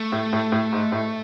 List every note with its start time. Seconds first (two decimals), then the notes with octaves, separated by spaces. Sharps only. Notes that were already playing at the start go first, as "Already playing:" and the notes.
Already playing: A3
0.12 A2
0.33 A2
0.52 A2
0.73 G#2
0.92 A2